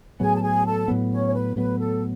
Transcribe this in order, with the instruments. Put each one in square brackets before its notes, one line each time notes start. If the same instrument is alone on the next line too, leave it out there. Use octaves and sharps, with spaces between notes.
[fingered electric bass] A2 F#3 B3 [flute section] G#4 G#5
[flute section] A5
G#4 G#5
A4 A5
[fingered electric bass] A2 F#3 B3
[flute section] C#4 C#5
C#5
B4
[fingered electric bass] A2 F#3 B3 [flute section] B4
[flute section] A4